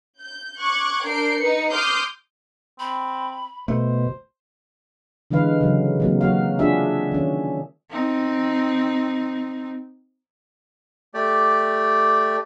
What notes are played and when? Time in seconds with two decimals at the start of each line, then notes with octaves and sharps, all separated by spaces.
0.21 G6
0.58 C#6 D6 F#6 G#6
1.04 D4 A#4 G6 C7 D7
1.37 D#4 B4 C#7
1.72 C6 D6 D#6 F6 G6 C7
2.79 C4 B5
3.68 B2 A3 C5
5.31 D3 E3 G#3 B4 F5
5.61 C#3 F#3
6.00 C3 F#3 A#3
6.21 F#3 A#3 F#4 F5
6.59 D4 F4 F#4 G#4 E5
7.12 D#3 C#4
7.90 C4 D#4
11.14 A3 G4 D5